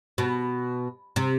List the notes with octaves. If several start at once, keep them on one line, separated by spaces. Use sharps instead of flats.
B2
C3